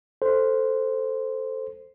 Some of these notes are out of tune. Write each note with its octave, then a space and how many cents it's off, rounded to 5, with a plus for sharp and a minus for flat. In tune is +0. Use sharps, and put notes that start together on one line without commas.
A4 +5 C5 +0